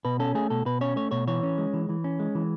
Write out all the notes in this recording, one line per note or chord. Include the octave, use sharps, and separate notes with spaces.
B2 B4
C#4 A4
A3 G#4
B2 A4
B2 B4
C#4 C#5
A3 C#5
B2 C#5
E3 C#5
C#4
G#3
E3
E3
C#4
G#3
E3